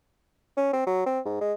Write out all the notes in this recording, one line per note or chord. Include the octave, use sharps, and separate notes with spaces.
C#4
C4
F#3
C4
G#2
G#3